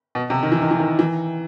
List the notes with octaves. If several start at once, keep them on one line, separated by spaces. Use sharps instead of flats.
B2
C3
D#3
E3
D#3
E3
D#3
E3